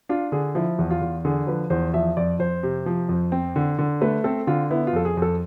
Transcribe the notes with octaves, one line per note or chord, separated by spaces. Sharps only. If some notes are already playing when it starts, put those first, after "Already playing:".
D4 F4
D3 G#4
F3 E4
E2
F4
E2
D3 G#4
F3 B4
E2 C5
F3 E5
F2 D5
F2 C5
C3
F3
F2
C4
D3
D3
A3 B4
C4 A4
D3 F4
B3 E4
F4
F2 A4
G#4
F2
A4